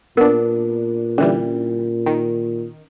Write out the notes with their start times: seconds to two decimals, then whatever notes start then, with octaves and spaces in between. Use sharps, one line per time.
0.17 A#2 B3 D4 A#4
1.18 D3 E3 G3 C#4
2.06 D#3